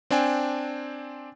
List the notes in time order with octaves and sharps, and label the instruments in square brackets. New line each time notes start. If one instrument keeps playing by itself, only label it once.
[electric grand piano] C4 D4 G5 G#5